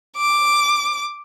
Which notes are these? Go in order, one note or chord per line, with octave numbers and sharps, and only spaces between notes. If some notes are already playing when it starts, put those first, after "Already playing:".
D6